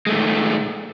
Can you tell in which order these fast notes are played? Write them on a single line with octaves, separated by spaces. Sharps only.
G#3 A3 D#3 A#2